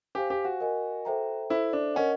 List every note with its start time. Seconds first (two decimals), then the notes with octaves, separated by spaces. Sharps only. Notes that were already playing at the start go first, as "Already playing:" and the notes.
0.15 G4 C5 F5 G#5
0.30 G4
0.45 F#4
0.61 A#4 D#5 G#5
1.05 A4 C5 E5 G5 A#5
1.50 E4 A4 C5 E5
1.73 D4
1.95 C#4 A#4 D#5 F#5